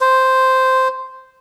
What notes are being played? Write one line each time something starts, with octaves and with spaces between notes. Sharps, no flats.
C5